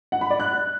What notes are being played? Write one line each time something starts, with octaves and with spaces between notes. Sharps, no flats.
F#5
B5
D5
F#6